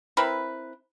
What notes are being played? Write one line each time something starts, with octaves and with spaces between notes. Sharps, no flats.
C4 E4 A#4 B4